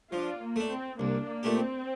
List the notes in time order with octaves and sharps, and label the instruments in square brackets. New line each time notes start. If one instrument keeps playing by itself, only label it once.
[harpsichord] F3 [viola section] D4 F4
[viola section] A#3
[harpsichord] A3 D4
[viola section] C4
[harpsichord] C2 [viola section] A#3 D4
[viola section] A#3
[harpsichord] A#2 A3 D4 G4
[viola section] C4